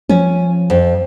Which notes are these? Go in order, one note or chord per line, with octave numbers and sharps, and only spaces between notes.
F3 C#4
F2